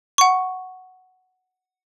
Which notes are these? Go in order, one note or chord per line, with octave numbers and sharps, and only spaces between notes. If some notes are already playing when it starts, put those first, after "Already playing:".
F#5 C#6